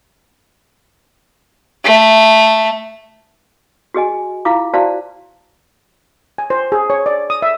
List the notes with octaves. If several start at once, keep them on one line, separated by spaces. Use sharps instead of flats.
A3
F#4 G#4 D#5 G#5
E4 F4 F5 D6
E4 F#4 C5 D5 F5 A5
G#5
C5
G#4
C#5
D5
D#6
E5